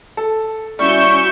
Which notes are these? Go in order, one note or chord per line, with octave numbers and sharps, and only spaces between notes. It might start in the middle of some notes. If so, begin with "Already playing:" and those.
A4
G3 C#4 E4 F#4 C#6 G6 E7